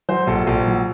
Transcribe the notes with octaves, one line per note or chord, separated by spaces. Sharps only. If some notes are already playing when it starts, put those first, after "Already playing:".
F#3 C5
A#1 A4
A#1
F#3